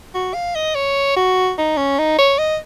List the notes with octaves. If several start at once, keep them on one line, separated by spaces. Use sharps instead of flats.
F#4
F5
D#5
C#5
F#4
D#4
C#4
D#4
C#5
D#5